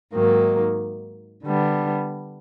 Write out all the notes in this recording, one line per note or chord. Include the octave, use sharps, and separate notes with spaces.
G#2 D#3 F#3 A#3
D3 G3 B3 D4